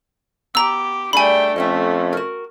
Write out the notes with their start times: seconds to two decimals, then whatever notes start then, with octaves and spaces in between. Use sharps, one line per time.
0.55 B3 G4 A#5 E6
1.13 G3 A3 D4 G#4 G5 G#5 B5
1.56 F2 A3 C#4 D#5 E5 G5
2.13 F#4 A#4